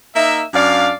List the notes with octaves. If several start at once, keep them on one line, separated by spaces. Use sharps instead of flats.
A#3 D#4 E5
F#2 D4 D5 F5